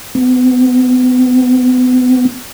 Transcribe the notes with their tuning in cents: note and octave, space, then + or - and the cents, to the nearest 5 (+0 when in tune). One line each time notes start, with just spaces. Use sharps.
B3 +35